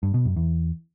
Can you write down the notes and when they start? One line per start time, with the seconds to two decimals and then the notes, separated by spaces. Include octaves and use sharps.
0.03 G2
0.14 B2
0.25 F#2
0.36 E2